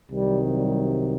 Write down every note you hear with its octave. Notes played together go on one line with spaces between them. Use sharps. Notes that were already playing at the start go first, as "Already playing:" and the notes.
C2 C3 D#3 F#3 G3
G3